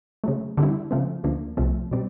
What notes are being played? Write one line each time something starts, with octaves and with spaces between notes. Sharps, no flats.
C#3 F#3 A3
D3 G3 C4 E4
C#3 F3 A3 C4
D2 D3 F3 A#3
C2 C3 F3 A3 C4
B2 G3 C4